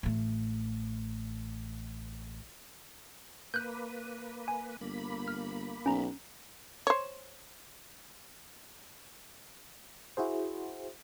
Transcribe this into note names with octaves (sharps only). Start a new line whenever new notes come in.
A1 A3
A#3 B4 F#6 G6
G#5
G1 A#3 B5
F6
B1 C#4 A#5
C5 C#5
E4 F#4 G#4 C5